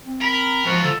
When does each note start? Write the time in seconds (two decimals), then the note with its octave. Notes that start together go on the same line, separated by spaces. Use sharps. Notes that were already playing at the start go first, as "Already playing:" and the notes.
0.05 C4
0.21 A#4 B5
0.66 G#2 F3 F4 F#4
0.83 D3 A4